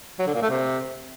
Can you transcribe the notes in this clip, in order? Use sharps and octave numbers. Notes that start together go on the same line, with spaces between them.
F#3
D3
A#2
A3
C3